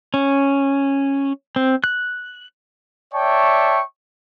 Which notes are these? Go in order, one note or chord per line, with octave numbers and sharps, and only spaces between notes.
C#4
C4
F#6
C#5 D5 E5 G5 A5 C#6